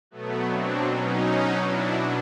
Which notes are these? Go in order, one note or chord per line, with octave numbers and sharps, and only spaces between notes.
B2 F#3 A3 B3
C4 D4
C#4 D#4
D4 E4